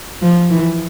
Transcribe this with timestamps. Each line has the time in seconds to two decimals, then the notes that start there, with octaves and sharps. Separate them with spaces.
0.22 F3
0.50 E3